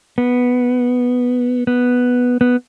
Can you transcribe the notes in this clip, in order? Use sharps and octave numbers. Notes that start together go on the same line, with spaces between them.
B3
B3
B3